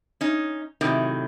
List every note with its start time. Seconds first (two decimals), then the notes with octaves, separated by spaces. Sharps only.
0.21 C#4 D#4
0.81 A2 C3 D#3 F#3